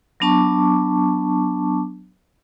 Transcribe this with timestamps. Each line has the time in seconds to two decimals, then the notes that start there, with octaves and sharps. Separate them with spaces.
0.20 F#3 B3 D4 A5 C#6 D6